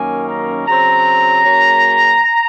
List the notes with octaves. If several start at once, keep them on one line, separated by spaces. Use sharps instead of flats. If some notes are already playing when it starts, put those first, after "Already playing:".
Already playing: F#2 D#3 A#3 C#4 G#5
A#5
C#3 F#3 C4 A#5
C#3 F#3 A#3 C#4